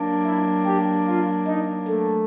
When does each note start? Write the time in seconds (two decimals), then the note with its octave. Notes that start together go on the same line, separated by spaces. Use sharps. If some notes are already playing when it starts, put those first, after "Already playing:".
Already playing: F#3 A#3 D4
0.25 E4
0.66 G4
1.07 F4
1.47 D#4
1.88 A3